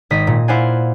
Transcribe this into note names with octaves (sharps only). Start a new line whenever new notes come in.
G#1 D#5 B6
A#2
E4 C5 D5 F5 F#5 G#5